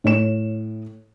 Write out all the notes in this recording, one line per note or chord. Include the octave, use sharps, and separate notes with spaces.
A2 C#5 E7